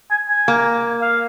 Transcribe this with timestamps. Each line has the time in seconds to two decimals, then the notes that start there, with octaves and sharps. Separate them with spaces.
0.11 G#5
0.29 G#5
0.48 A#3
1.02 F5